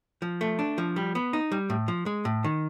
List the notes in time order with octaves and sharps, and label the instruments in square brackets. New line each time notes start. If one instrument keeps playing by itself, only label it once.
[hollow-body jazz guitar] F3
A3
D4
F3
G3
B3
D#4
G3
A2
F3
G#3
A2
D#3